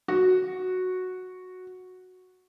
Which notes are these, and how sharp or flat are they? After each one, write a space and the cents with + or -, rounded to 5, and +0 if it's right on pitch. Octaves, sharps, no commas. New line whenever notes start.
F#4 -5